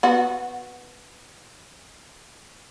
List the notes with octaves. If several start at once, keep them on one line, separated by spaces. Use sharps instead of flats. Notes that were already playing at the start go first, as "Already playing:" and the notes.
B3 F#4